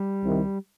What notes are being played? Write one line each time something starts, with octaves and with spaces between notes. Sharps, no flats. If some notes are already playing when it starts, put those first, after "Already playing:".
Already playing: G3
C2 C3 D#3